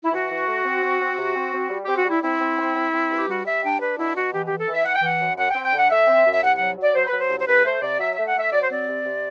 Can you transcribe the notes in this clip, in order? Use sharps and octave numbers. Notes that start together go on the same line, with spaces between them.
E4
E3 F#4
E3
A3
C4
C4
C4
C3
C4
C4
G3
C4 G4
F#4
G3 E4
C4 E4
C4
C4
C4
C4
G2
G4
G3 F#4
G3 E5
D4 G5
D4 B4
B2 E4
B2 F#4
E3 G4
E3 G4
A4
E3
E5
E3 F#5
G5
E3 F#5
F#2
F#2 F#5
G5
C4
G5
D3 F#5
A3 E5
C4
F#2
E5
C2 F#5
F#3 F#5
F#3 D5
F#3 C5
B4
F#3
C5
C2
C5
C2 B4
A3 C5
C3 D5
F#3 E5
E5
A3
F#5
A3 E5
F#3 D5
C5
C4 D5
C3
C3